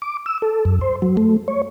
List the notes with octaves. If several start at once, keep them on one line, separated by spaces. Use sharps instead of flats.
D6
E6
A4
F#2
C5
F#3
A3
C#5